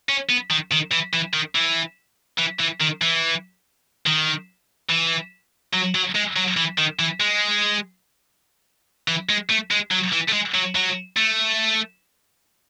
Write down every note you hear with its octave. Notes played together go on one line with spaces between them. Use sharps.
C#4
B3
D#3
D#3
E3
E3
D#3
E3
E3
E3
D#3
E3
D#3
E3
F#3
F#3
G#3
F#3
E3
D#3
E3
G#3
E3
G#3
A3
G#3
F#3
E3
A3
G#3
F#3
F#3
A3